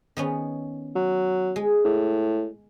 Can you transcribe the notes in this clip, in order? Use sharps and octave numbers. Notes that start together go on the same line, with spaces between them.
D#3 B3 C#4
F#3
G#3
A2